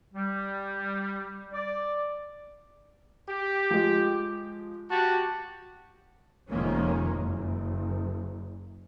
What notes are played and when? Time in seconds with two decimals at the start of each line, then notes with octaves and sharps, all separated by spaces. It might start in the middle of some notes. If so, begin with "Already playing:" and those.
0.14 G3
1.52 D5
3.29 G4
3.70 F3 G#3
4.91 F#4 G4 A5
6.49 F1 F2 D#3 G#3 A#3 C#4
7.16 F#1